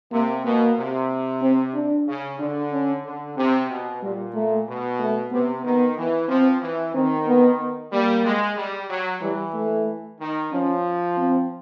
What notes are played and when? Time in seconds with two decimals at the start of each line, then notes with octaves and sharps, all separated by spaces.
0.12 C3 A#3
0.45 B2 A#3
0.77 C3
1.42 C4
1.74 D4
2.07 C#3
2.39 D3 D4
2.72 C#4
3.04 D3
3.37 C3 C4
3.70 B2
4.02 A#2 G3
4.34 A3
4.67 B2
5.00 A3
5.32 C3 B3
5.65 D#3 B3
5.97 E3
6.29 F3 C4
6.62 E3
6.94 D#3 C4
7.27 B3
7.92 G3 A#3
8.25 G#3
8.57 G3
8.89 F#3
9.22 E3 G3
9.54 A3
10.19 D#3
10.52 F3 C#4
11.17 C4